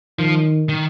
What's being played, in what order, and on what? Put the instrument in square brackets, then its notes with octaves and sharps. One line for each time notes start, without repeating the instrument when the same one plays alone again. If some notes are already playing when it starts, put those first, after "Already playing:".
[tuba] D#3 [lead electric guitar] F3
[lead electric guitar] D#3